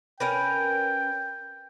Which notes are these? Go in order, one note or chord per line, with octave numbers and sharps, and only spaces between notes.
C#4 A#4 B4 G5